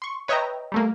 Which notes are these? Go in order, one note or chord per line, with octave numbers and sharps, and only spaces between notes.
C6 C#6
B4 C#5 D#5 E5 G5 A#5
G3 A3 A#3